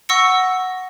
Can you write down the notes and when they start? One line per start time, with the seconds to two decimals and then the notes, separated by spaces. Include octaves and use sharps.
0.09 F#5 C#6 E6 A#6 C#7